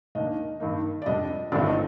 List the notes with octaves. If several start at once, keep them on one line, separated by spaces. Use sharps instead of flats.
D#2 D#3 A#3 D4 D#5
G2 D#3 A#3 D#4
D5
F2 C3 G3 D4 D#5
G1 G2 D#3 A3 C4 D5
D#5